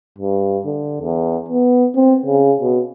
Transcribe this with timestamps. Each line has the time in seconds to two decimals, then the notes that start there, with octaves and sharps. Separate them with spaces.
0.18 G2
0.66 D3
1.01 E2
1.48 B3
1.95 C4
2.26 C#3
2.61 B2